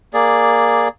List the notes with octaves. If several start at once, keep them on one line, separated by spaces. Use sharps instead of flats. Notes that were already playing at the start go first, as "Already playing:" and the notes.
A#3 G#4 D5